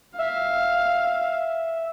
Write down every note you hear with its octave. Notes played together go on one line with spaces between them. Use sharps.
E5 F5